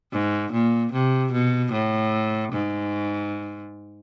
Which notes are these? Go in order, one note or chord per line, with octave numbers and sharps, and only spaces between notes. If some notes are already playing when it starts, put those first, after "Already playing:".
G#2
A#2
C3
B2
A2
G#2